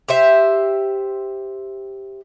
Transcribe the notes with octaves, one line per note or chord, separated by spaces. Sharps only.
G4 C5 E5